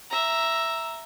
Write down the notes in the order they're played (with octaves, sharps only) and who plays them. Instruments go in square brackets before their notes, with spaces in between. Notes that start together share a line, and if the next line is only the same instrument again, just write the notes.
[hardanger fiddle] E5 A#5